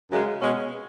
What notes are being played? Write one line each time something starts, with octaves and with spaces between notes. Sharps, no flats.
F#2 C#3 G#3
B2 G#3 C#4